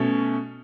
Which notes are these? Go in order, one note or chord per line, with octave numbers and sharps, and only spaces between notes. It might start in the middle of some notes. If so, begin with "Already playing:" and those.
Already playing: B2 A3 C#4